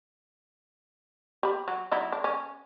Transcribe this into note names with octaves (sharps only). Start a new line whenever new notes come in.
G4 B5
F#3
F#3 D#4 E4
D4
C#4